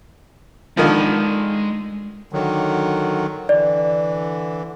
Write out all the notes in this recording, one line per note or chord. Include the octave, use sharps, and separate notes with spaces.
D3 D#3 F3 G#3 B5
D3 D#3 F#3
D3 E3 D5